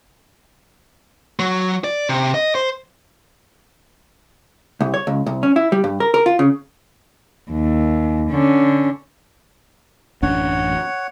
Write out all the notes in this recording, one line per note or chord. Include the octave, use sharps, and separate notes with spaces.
F#3
D5
C3
D#5
C5
C2
C#5
C#2
C2
C#4
E4
G3
G2
A#4
A#4
F4
C#3
D#2
D3 C#4
A1 F#2 D4 C#5 F#5